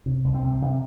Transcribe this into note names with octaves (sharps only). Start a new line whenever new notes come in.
C3
C2
C4
C3
C3